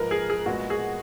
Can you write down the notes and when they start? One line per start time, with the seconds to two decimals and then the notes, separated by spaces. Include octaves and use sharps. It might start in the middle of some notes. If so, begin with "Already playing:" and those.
Already playing: G#2 F3 A#3 A#4 B4
0.11 G#4
0.30 G#4
0.46 A#2 G#3 B3 F#4
0.70 G#4